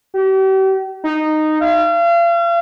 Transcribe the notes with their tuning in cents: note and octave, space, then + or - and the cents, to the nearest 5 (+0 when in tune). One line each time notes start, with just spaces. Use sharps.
G4 -40
D#4 -10
F5 -40